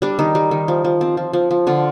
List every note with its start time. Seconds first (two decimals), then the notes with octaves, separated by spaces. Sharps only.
0.02 G3 D4
0.19 D#3 D#4
0.35 G3
0.51 D#3
0.68 F3
0.84 F3
1.01 C4
1.17 F3
1.33 F3
1.51 F3
1.67 D3 F4